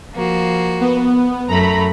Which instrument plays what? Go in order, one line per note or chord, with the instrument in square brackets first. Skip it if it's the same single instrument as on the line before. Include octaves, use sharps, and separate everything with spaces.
[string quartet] F3 A#3 F#4
[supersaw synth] B3
[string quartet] F#2 A3 [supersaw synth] A#5 B5